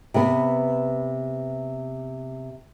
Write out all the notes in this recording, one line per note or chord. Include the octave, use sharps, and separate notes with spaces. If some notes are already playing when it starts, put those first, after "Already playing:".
C3 B3